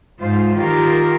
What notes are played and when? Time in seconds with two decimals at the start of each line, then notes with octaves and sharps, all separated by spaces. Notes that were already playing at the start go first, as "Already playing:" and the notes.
0.20 G#2 F4 C5
0.55 D#3 F4 G4 A#4